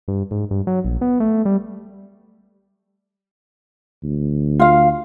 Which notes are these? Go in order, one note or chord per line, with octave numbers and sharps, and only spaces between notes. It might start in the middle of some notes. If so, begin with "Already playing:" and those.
G2
G#2
G2
F#3
A#1
B3
A3
G3
D2
F4 F5